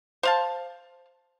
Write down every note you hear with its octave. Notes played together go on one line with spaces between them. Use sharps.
C5 F5 A5